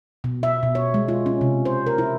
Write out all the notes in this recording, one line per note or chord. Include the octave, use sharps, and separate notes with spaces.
B2
E5
B2
C#5
G#3
F4
C#4
C3
C5
A#4
E4